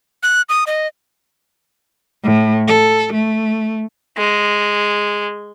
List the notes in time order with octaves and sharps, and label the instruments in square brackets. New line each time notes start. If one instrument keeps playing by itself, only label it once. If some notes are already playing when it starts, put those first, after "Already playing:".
[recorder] F#6
D#6
D#5
[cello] A2
A4
A3
[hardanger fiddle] G#3